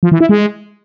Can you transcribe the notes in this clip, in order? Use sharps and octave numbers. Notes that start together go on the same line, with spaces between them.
F3
E3
E4
G#3